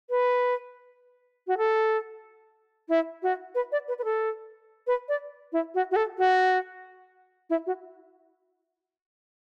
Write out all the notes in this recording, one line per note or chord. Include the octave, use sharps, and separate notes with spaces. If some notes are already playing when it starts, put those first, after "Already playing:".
B4
F#4
A4
E4
F#4
B4
D5
B4
B4
A4
B4
D5
E4
F#4
F#4
A4
F#4
E4
F#4